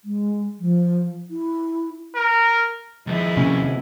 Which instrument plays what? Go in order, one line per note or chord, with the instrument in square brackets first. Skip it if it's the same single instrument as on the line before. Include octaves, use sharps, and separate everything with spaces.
[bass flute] G#3
F3
E4
[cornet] A#4
[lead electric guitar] D#2 F3 [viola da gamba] G#3 E4
[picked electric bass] C3 A#3 C4 [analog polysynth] C#4